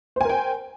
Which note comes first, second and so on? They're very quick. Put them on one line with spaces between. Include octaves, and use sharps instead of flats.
C5 G#5 A#4 G5